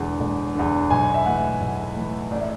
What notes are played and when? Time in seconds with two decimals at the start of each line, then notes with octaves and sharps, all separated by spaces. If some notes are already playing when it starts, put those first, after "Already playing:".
Already playing: E1 E2 D3
0.20 E1
0.55 E2 D3
0.90 B1 G#5
1.14 E5
1.26 A2 E3 F#5
1.61 B1
1.96 A2 E3
2.31 A1 D5
2.40 E5